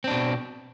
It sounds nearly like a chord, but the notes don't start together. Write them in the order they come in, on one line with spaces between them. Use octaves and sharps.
C4 D4 B2